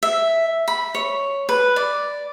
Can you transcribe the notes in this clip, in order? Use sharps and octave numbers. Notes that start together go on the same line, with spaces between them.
E5
B5
C#5
B4
D5